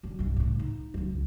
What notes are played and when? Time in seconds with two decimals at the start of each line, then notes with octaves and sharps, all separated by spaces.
0.03 F#2 D3
0.19 C2 G2
0.36 C#2 A2
0.59 D#4
0.94 C#2 F#2